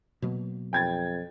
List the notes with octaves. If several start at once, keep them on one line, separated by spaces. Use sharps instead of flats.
B2 F#3 A#3
F2 G5 G#6 A6